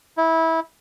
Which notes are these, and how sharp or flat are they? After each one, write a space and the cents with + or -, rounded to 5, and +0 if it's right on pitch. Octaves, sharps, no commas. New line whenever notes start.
E4 -20